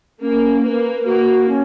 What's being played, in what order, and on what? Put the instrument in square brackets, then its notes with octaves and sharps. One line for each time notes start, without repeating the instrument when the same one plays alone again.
[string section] A#3 [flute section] C#4
[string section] A#3 [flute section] B4
[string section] A#3 [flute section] F#4
[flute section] C#4